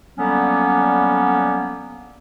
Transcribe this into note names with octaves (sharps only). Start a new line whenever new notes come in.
D3 F#3 G3 A#3 B3 C#4